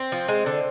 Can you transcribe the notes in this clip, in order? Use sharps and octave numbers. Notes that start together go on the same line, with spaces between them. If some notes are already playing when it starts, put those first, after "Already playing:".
Already playing: C4
F3
G#3
D3